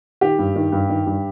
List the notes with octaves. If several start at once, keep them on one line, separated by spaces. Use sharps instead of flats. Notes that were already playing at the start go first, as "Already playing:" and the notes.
D#3 G4
G2
D#3
G2
D#3
G2